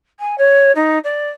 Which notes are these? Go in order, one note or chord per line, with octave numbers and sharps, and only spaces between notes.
G#5
C#5
D#4
D5